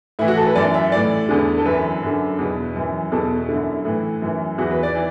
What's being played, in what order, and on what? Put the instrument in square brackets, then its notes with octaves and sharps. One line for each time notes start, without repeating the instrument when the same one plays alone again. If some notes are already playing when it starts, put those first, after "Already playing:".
[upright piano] A2 E3 E4
F#4
A4
B4
F#2 E3 D5
E5
A2 E3 D5
E2 D3
A4
F#2 E3 B4
F#2 D3
E2 B2
F#2 E3
E2 B2 A4
F#2 D3 E4
A2 E3
F#2 E3
E2 E3 F#4
B4
D5
E3